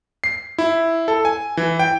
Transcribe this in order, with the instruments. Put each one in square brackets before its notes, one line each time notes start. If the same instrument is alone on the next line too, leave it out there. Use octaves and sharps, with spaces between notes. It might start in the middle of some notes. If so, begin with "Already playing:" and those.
[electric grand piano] C7
E4
A4
G#5
E3
G5